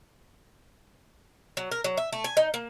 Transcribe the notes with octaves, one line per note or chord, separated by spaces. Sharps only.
F#3
A#4
F#3
E5
A3
G#5
D#4
A#3